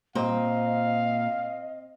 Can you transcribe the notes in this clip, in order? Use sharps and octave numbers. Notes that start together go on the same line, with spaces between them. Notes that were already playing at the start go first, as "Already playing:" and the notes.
A#2 C4 D#5 F5